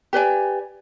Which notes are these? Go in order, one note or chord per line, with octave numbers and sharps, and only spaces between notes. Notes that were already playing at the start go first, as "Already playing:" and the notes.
G4 B4 D5 G#5